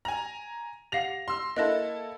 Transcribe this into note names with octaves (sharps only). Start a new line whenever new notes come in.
G#5 A#5 F#7
G4 F5 F#5 A#6 F7
C6 E6
A#3 E4 A4 D#5 F#6 A#6